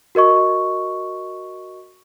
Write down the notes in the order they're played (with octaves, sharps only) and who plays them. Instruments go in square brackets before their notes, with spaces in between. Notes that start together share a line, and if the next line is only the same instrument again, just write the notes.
[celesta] F#4 A#4 D#5 C#6